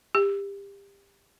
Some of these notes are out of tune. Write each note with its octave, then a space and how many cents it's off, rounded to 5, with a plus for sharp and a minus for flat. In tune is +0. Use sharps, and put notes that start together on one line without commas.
G4 +25